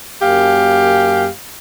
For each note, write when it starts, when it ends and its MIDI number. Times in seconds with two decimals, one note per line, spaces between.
0.21 1.28 42
0.21 1.28 58
0.21 1.28 67
0.21 1.28 77
0.21 1.28 80